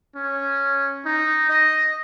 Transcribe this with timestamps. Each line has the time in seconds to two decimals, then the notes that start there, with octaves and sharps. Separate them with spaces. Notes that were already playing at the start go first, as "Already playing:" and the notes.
0.16 C#4
1.05 D#4
1.50 D#5